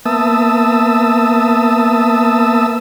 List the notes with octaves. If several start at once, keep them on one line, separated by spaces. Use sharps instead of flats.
A#3 B3 E5 A5 D#6 E6